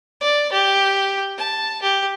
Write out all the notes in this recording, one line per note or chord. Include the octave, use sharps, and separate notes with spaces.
D5
G4
A5
G4